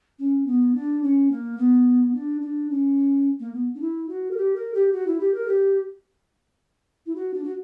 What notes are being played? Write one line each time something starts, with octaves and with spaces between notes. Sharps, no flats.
C#4
B3
D4
C#4
A#3
B3
D4
D4
C#4
A#3
B3
D4
E4
F#4
A#4
G4
A#4
G4
F#4
E4
G4
A#4
G4
E4
F#4
D4
F#4